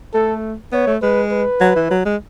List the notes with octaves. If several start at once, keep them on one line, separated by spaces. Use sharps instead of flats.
A3 A4
B3 C#5
A3
G#3 B4
B4
F#3
E3
F#3
G#3